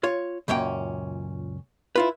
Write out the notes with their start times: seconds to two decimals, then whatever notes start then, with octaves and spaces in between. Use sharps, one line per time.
0.04 F4 C#5
0.48 C#2 F#2 A#2 C#4 G5
1.96 E4 F4 B4